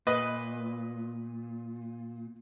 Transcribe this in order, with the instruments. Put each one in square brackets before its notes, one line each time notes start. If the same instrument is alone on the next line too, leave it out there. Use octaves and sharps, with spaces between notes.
[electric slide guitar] A#2 [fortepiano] B4 D#5